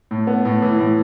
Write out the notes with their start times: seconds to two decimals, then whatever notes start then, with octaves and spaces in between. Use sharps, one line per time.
0.11 A2
0.27 B3
0.45 A2
0.62 E3
0.80 A2